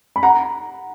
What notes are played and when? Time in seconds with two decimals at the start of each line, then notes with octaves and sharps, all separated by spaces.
0.16 B5
0.23 F#5 A#5